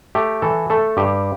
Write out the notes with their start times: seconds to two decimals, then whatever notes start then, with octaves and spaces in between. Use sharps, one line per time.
0.15 A3 G4
0.42 E3 A4
0.70 A3 A4
0.97 G2 G4